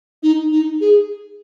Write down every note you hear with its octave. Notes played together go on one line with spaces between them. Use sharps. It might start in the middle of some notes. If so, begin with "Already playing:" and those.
D#4
D#4
G#4